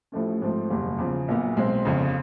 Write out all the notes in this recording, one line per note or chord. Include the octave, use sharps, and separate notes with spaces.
A1 A2 F3 A3 C#4
G#2 F3 A3 C4
F#1 E2 B2 G3
E2 C#3 F3
A#1 A#2 F#3 B3
B1 B2 G#3 C4
G1 F2 C#3